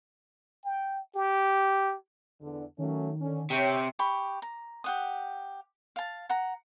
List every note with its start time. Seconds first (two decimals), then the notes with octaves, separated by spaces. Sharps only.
0.65 G5
1.15 G4
2.41 E2 D3
2.78 D#3 F#3 A3 C#4
3.21 D3 C#4
3.50 C3 G4 C#5 G5
3.99 G4 B5 C#6
4.42 A#5
4.84 G4 F#5 D#6
5.96 F5 A5
6.30 F#5 A#5